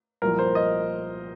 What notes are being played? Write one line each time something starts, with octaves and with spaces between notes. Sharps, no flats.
C2 A#2 F3 A#4
C5
D#5